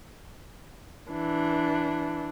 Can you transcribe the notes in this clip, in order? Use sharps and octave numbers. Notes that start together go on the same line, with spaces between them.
E3 D4